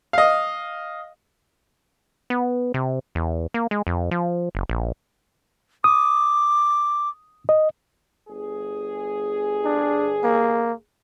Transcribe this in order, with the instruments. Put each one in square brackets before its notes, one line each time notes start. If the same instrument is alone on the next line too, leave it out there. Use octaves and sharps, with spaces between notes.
[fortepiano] D#5 F5
[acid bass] B3
C3
E2
A#3
G#3
F2
F3
F#1
A#1
[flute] D6 [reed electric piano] D#6
[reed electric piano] D#5
[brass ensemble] G1 G#4
[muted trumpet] D4
A#3